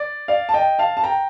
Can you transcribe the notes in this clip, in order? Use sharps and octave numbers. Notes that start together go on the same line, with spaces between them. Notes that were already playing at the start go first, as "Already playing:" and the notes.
Already playing: D5
D5 F5
A5
D#5 G5
F5 A5
A5
G5 A#5